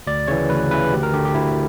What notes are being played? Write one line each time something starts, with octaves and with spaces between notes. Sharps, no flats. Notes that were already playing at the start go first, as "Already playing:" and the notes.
D2 D5
C#3 E3 C#5
D2 B4
C#3 E3 B4
D2 G4
A#4
D3 G4
G4
D2 E4